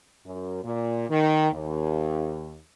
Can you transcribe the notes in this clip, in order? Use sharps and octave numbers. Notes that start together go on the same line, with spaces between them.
F#2
A#2
D#3
D#2